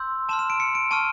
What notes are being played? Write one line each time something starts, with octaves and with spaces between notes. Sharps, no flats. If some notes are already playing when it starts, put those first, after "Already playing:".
Already playing: C6 E6 G6
A5 C6 F6 E7
E7
D7
C#7
D7
A5 C#6 F6 D#7